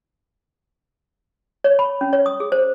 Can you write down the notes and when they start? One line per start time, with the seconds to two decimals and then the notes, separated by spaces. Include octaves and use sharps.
1.64 C#5
1.79 B5
2.01 C#4
2.13 C#5
2.26 D#6
2.40 G#4
2.52 C5